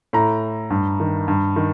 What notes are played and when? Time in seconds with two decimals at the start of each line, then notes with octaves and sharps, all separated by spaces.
0.13 A2 A#5
0.70 G2
1.00 D#3
1.28 G2
1.56 D#3